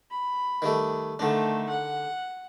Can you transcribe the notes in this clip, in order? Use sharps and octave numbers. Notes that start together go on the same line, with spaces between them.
B5
D#3 G3 A3
D3 D#3 A3 D4
F#5